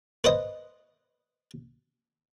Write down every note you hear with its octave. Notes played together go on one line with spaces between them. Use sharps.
B4 C5 D#5